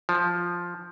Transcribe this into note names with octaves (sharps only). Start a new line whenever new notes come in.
F3